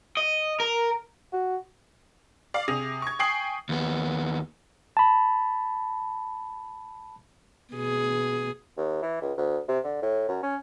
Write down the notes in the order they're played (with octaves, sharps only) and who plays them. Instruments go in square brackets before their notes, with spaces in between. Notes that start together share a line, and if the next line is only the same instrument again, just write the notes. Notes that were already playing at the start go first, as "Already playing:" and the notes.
[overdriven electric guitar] D#5
A#4
[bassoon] F#4
[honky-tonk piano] D5 F5
C3 G#4 D#6 A#6 F7
C#6 G#6
G5 G#5 C#6 D#6 C7 F#7
[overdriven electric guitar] D#2 B3
[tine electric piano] A5 B5
[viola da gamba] B2 G#4
[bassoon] D#2
E3
C#2
D2
C3
D3
A2
F#2
C#4